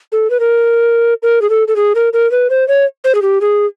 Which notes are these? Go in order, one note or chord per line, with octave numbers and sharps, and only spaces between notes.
A4
B4
A#4
A#4
G#4
A4
A4
G#4
A#4
A#4
B4
C5
C#5
C5
G#4
G4
G#4